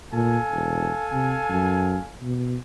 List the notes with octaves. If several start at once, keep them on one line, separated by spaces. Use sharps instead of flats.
A#2 A4 F5 G#5
E1
C3
F#2
B2